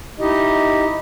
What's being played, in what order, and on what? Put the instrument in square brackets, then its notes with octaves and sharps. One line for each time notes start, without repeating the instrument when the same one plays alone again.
[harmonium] D#4 E4 G4 D#5